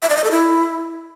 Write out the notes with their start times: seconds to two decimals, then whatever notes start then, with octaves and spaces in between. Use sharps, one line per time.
0.02 E5
0.09 D5
0.17 D#5
0.24 A4
0.31 E4